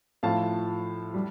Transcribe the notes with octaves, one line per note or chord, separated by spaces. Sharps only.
A2 F3 F5 A5
G3